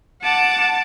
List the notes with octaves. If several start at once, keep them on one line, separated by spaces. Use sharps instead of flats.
F#5 A5 D6